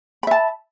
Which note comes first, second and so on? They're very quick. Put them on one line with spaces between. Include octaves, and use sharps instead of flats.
B5 E5 A5